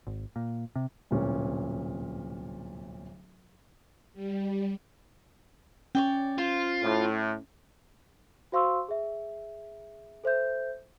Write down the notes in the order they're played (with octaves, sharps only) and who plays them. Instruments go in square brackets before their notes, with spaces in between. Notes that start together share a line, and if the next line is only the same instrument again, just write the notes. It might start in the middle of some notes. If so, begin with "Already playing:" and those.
[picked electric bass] G#1
A#2
C3
[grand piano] D1 C2 A#2 C#4
[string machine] G3
[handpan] C#4 [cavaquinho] C#5 D5 G5
[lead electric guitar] F4 [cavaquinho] C5
[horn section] A2
[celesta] F#4 C5 F5 C6 C#6 E6
G#4 E5
A4 C5 E5 G6